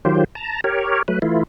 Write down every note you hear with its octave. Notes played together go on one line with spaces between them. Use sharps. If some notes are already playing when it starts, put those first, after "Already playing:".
D#3 F#3 F4 G4 C5
A5 A#5
G4 A#4 C#5
F#3 A3 B4
E3 A3 E4 F4